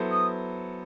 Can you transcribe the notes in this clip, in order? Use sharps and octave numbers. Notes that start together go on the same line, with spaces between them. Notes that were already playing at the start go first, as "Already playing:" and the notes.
Already playing: F#3 B3 E4 A4 C5
D#6